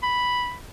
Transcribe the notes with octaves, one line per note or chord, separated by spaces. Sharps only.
B5